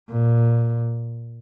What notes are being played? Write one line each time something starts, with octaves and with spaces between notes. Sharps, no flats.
A#2